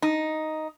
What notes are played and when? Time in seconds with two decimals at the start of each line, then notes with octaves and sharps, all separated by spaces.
0.02 D#4